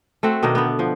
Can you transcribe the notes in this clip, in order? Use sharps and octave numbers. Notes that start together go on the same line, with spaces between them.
A3 C4 F#4
B2 D#3 D4 D#4
D3 B3
F3